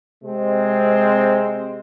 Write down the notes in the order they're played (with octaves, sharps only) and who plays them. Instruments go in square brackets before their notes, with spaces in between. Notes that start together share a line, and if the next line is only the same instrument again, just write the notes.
[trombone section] C3 G#3 C4